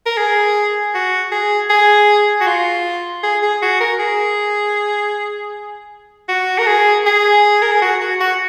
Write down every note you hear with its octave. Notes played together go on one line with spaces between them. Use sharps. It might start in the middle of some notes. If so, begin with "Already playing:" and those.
A#4
G#4
F#4
G#4
G#4
F#4
F4
G#4
G#4
F#4
A#4
G#4
F#4
A#4
G#4
G#4
A#4
G#4
F#4
F#4
F#4